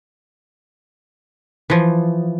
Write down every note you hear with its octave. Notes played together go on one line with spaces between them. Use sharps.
E3 F3